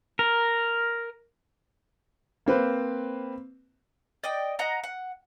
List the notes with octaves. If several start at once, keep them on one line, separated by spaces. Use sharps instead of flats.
A#4
A#3 C4 B4 C5
D5 D#5 G5
D#5 F#5 A#5
F#5